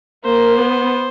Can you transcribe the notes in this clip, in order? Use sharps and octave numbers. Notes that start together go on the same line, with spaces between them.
A#3 C5
B3